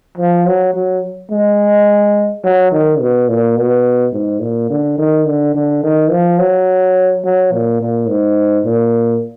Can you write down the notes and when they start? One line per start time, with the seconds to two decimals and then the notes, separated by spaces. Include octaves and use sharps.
0.17 F3
0.46 F#3
0.74 F#3
1.30 G#3
2.43 F#3
2.72 D#3
3.00 B2
3.28 A#2
3.56 B2
4.13 G#2
4.41 A#2
4.70 D3
4.98 D#3
5.26 D3
5.54 D3
5.83 D#3
6.11 F3
6.39 F#3
7.24 F#3
7.52 A#2
7.80 A#2
8.08 G#2
8.65 A#2